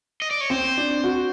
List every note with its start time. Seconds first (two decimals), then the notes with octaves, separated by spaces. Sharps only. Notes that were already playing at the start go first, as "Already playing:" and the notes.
0.22 D#5
0.31 D5
0.41 C#5
0.50 C4 C5
0.78 D4
1.04 F#4